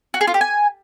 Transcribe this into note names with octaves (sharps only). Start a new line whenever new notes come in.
F#4
G#4
F4
G4
G#5